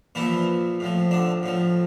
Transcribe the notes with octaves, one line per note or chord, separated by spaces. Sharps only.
A#2 E3 F3 E4
A2 F3
D3 D4
A2 F3